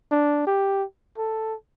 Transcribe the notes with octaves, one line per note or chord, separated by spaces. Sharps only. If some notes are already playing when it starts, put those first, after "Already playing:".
D4
G4
A4